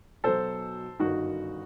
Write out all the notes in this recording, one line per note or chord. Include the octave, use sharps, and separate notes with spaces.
B1 B2 F#3 A4 C5
G1 F#2 D#3 D#4 F#4